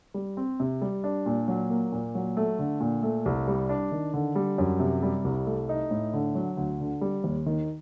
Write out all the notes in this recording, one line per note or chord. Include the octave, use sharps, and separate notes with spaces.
G3
C4
C3
G3
D4
A#2
F#3
A#3
A#2
F#3
A3
D3
A#2
A3
C2
G3
D4
D#3
D3
G3
F#2
C3
G3
C2
A3
D#4
A2
D3
F#3
D2
D3
G3
D#2
D#3